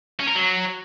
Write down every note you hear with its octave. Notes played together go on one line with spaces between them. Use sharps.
C#4
A#4
F#3